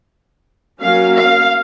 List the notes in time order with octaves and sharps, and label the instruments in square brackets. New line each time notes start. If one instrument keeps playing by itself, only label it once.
[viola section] F#3 A#3 C#4 F5
F5